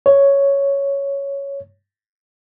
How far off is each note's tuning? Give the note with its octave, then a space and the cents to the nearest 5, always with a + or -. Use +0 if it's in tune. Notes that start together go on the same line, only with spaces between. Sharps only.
C#5 +5